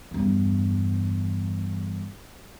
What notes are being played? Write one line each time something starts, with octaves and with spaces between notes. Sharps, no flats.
E2 G2